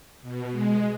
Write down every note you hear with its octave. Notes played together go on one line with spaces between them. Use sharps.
B2
G#3